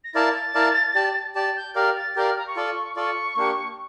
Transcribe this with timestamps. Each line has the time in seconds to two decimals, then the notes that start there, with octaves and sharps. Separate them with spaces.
0.03 A#6
0.14 E4 A#4 D5 F5 A5 A6
0.54 E4 A#4 D5 F5 A5
0.95 G4 D5 A5
1.35 G4 D5 A5 A6
1.55 G6
1.75 G4 A#4 D5 F5 F6
1.96 A6
2.15 G4 A#4 D5 F5 G6
2.26 F6
2.37 A#5
2.46 C#6
2.56 F4 A4 D5
2.96 F4 A4 D5 C#6
3.37 A#3 D4 G4